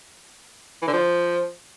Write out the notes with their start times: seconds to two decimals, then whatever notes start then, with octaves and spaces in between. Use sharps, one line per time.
0.82 E3
0.88 D3
0.93 F3